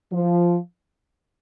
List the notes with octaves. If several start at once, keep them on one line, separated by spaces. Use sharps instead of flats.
F3